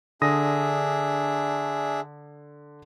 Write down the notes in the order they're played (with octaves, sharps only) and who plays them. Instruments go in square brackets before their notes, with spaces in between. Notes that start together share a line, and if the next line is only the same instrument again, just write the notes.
[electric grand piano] D3 D#6 A#6 [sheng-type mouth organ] D4 G#4 E5